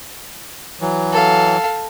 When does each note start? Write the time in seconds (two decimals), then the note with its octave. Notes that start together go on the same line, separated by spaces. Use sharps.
0.81 E3 F#3
1.12 A4 F5